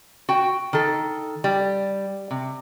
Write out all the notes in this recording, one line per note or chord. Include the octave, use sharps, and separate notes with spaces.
F#4 G5
D#3 A4
G3
C3